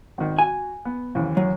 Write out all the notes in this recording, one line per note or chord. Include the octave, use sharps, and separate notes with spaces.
G#1 D#3
F#4 G#5
B3
F#1 D#2 E3
F#3